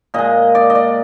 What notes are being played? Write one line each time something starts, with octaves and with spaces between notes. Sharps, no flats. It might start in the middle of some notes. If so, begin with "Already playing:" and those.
A#2 G#3 D#5
D5
D#5
D5